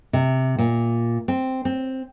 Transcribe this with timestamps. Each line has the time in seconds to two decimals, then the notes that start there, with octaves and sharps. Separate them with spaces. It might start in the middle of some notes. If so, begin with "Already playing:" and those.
0.13 C3
0.59 A#2
1.28 C4
1.65 C4